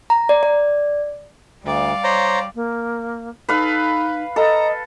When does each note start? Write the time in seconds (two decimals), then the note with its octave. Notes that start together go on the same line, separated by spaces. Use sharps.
0.10 A#5
0.29 D5
0.43 D5
1.65 D2 G3 D5 F5
2.04 C5 C#5 A#5
2.55 A#3
3.49 D#4 A4 B4 F5
4.36 A4 D#5 A#5